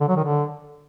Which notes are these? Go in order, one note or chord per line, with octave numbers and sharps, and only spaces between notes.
D3
F#3
D#3
D3